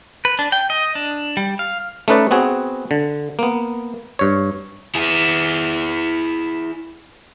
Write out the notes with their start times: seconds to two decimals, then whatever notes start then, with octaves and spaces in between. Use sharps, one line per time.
0.25 B4
0.39 D4
0.52 G5
0.70 D#5
0.95 D4
1.37 G3
1.59 F5
2.08 A3 C#4 D#4 B4 D5
2.31 B3 C4 F#4 G#4
2.91 D3
3.39 A#3 B3
4.19 G2 C#5
4.95 E4 G#4